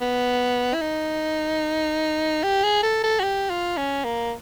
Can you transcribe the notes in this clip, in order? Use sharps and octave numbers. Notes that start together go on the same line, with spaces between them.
B3
E4
D#4
G4
G#4
A4
A4
F#4
G4
F4
C#4
A#3